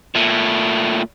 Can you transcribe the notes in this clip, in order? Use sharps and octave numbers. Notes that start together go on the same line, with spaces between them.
A#2 A3